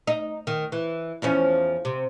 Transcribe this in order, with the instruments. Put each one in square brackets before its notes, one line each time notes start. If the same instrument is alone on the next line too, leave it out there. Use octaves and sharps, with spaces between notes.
[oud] D#4
D#3
E3
E2 F3 C#4
C3